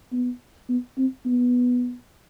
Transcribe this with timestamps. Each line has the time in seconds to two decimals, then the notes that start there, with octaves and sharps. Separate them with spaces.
0.12 B3
0.69 B3
0.98 C4
1.26 B3